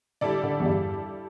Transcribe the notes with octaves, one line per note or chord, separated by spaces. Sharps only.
D3 G3 E4 A4 D5
D3
E2
G2